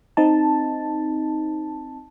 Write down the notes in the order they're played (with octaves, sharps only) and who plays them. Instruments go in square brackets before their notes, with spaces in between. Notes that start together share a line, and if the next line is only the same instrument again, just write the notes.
[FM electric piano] C4 D#4 A5